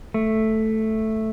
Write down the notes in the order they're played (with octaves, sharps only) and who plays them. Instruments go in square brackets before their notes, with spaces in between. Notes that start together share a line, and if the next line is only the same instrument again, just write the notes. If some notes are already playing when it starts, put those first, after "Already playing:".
[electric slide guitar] A3